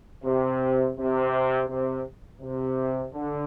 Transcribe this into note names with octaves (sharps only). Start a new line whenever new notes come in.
C3
C3
C3
C3
D3